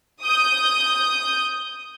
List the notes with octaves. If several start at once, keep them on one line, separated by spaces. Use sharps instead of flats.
D#6 G6